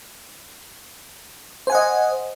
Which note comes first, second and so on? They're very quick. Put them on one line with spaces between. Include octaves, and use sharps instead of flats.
C5 G#5 F#5 D#5